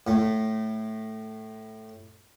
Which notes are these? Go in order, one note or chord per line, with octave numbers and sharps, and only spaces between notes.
A2 A3